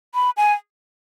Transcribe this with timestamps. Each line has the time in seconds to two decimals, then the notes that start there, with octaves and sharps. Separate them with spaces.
0.15 B5
0.37 G#5